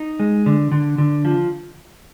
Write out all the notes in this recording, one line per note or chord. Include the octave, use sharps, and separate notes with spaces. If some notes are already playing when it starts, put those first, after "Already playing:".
Already playing: D#4
G#3
D3
D3
D3
F3